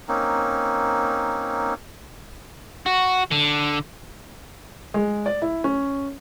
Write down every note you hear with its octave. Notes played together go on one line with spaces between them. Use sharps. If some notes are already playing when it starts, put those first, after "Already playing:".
A#3 C4 C#4 D#4
F#4
D3
G#3
D5
E4
C#4